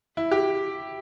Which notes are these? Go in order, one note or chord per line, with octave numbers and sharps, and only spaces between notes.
E4
G4